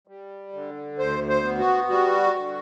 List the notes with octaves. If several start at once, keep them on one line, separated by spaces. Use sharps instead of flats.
G3
D3
D2 C5
C5
B3
F#4
G3 F#4
D3